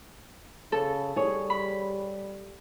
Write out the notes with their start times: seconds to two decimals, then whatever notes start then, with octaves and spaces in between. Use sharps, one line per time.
0.72 C#3 A4
1.16 G3 G#4 C#5
1.50 B5